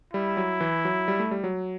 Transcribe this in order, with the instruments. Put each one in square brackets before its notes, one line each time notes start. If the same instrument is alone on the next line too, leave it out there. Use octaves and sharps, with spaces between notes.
[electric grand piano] G3 [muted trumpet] E4
[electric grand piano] F#3
E3
F#3
G3
A3
G3
F#3